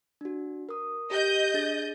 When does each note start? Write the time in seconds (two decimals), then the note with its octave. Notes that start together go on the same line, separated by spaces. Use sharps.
0.21 D4 F#4
0.69 A#4 D#6
1.11 G4 D#5 G6
1.54 D4 G#4 A6